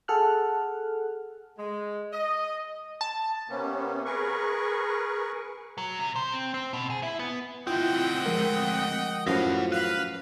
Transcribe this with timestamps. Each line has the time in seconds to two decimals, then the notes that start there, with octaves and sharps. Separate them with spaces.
0.08 G#4 A4 F#5 F6 F#6
1.58 G#3
2.12 D#5
3.01 A5
3.49 C3 A#3 B3 C#4
4.05 G#4 A#4 B4 C#6
5.78 F#3
6.00 C3
6.16 C5
6.32 C4
6.54 C4
6.73 B2
6.90 G#4
7.03 E4
7.19 B3
7.67 D2 C4 E4 F4 D#5 F#5 G5
8.26 F3 G#3 A#4
9.27 F#2 A2 F3 E4 B4 F5 F#5 A#6
9.72 B4 F5